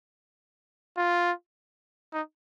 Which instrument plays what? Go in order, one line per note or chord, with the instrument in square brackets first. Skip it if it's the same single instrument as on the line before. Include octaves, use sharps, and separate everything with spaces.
[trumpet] F4
D#4